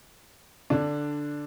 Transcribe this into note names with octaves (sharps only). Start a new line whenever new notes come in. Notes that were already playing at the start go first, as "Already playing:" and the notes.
D3 D4